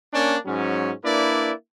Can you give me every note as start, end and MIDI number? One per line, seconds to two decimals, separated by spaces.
0.13 0.37 58
0.13 0.37 61
0.13 0.37 62
0.46 0.92 44
0.46 0.92 54
0.46 0.92 61
1.04 1.52 58
1.04 1.52 62
1.04 1.52 64
1.04 1.52 71
1.04 1.52 74